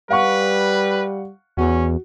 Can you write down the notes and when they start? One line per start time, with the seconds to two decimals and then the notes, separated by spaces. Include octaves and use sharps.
0.10 G3 B4 F5 F#5 C#6
1.57 E2 C#4 F#4